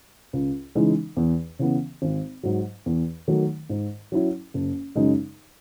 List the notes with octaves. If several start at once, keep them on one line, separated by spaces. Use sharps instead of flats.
C#2
C#3 E3 G#3 D#4
E2
C#3 E3 B3
G#1
G#2 F#3
E2
D#3 F#3 A3
G#2
F#3 C#4 E4
F#1
F#2 C#3 G#3 D#4